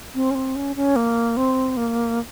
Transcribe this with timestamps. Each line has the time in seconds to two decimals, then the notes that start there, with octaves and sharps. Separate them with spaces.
0.15 C4
0.31 C#4
0.35 C4
0.56 C#4
0.76 C#4
0.96 A#3
1.37 C4
1.77 A#3